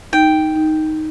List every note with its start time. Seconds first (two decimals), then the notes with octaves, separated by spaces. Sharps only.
0.13 D#4 G5
0.56 D#4